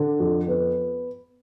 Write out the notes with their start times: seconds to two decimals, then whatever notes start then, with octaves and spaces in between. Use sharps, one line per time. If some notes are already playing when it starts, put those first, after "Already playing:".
Already playing: D3
0.20 F2
0.48 B3